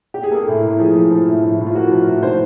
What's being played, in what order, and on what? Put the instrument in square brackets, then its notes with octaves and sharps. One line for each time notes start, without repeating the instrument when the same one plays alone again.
[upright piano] G4
G#4
A#3 A4
A2
A2
F3 G#4
F3
F3
A2
A2
A2
F4
A#3 F#4
F3
A2
D#3 C5